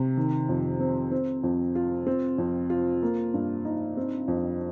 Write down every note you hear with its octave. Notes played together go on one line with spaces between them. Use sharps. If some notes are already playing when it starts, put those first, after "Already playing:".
Already playing: C3
D#3
F2
C4
C4
F2
F4
C4
F2
F4
A#3
G2
D#4
C4
F2